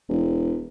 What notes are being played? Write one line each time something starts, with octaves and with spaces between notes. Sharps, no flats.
E1